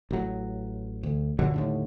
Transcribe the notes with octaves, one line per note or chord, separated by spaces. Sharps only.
A1 F#3
D2
A#1 G2 D3 F#3
D#2 A2 D3